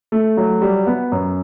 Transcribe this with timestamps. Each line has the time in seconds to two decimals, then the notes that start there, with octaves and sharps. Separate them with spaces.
0.12 A3
0.37 F#3
0.62 G3
0.87 B3
1.12 F#2